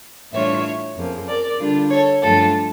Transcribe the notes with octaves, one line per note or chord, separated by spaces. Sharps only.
A2 E3 G3 D4 F4 C#5 E5
F2 C#3 F3 A#3
A#4 D5
D3 G3 D4 F4
A4 C#5
G2 F3 A3 D4 F4 A4